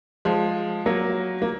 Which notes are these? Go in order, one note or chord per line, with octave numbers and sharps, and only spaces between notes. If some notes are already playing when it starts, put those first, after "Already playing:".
F3 G#3
F#3 A#3
A#3